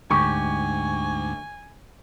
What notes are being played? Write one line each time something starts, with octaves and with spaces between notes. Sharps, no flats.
D2 G#2 D3 G4 G#5 C#6